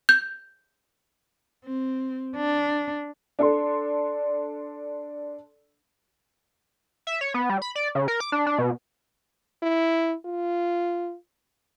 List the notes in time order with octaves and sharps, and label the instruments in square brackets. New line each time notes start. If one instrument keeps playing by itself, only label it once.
[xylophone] G6
[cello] C4
D4
[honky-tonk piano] D4 A4 C6
[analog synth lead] E5
C#5
B3
G3
B5
D5
C#3
A#4
D6
D4
D4
B2
[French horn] E4
F4